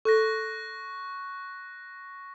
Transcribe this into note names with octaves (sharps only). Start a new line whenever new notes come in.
A4 C#6 F#6 A#6